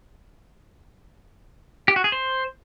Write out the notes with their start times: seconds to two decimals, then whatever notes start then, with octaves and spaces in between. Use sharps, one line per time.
1.88 G4
1.96 F#4
2.04 G#4
2.12 C5